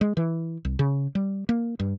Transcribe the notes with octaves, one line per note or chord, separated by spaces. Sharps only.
G#3
E3
C2
C#3
G3
A#3
G2